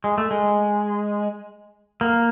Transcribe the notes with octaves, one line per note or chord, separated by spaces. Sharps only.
G#3
A3
G#3
A#3